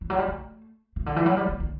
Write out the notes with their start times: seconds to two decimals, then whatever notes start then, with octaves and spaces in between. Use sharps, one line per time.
0.01 E3
0.10 F#3
0.18 G3
0.28 A3
0.96 C#3
1.06 D3
1.16 E3
1.26 F#3
1.37 G3
1.48 E3
1.60 D3